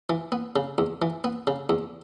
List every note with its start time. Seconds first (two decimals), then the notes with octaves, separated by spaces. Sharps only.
0.10 E3
0.32 B3
0.56 C#3
0.78 E2
1.02 E3
1.24 B3
1.47 C#3
1.69 E2